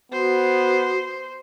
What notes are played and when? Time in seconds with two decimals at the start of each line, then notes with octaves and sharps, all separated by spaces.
0.12 B3 F#4 C5